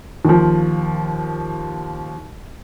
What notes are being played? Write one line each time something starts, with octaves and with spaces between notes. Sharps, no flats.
D#2 F3